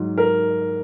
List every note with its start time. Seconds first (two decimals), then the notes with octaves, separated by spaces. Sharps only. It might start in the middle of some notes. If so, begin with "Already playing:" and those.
Already playing: G#2 F#3
0.18 A#4